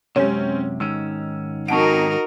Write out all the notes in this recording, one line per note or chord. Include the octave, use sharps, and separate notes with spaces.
F#2 C3 G#3 C4 C#4 G4 C#5
G#2 D#3 C#4 E6
F2 D#4 F#4 A#4 F#5 A5 C#6 D7